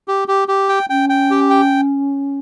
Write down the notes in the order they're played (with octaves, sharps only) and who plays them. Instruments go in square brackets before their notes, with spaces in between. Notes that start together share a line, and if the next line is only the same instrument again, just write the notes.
[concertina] G4
G4
G4
G5
[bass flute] C#4 [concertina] G5
[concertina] G5
G4
G5